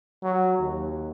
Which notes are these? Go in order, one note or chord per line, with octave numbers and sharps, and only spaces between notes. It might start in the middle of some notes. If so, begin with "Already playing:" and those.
F#3
D#2